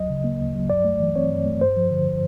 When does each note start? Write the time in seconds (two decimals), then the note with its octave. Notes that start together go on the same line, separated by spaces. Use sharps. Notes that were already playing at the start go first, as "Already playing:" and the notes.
Already playing: D2 F#3 D#5
0.10 C#3
0.24 A#3
0.39 D2
0.55 F#3
0.70 G2 D5
0.85 A3
1.00 E3
1.16 C4 C#5
1.30 G2
1.46 A3
1.61 G2 C5
1.77 F3
1.90 D3